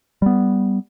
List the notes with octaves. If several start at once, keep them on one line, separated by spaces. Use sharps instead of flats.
G3 B3